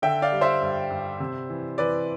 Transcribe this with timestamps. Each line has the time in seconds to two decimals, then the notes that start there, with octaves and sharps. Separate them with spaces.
0.02 D3 E5 G5
0.22 D5 F5
0.32 G3
0.41 C5 E5
0.62 G2
0.90 G2
1.20 C3
1.50 E3
1.78 E3 B4 D5